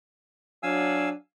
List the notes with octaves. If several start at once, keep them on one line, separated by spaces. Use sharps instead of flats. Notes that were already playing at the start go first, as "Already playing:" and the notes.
F#3 D4 F5 G#5 E6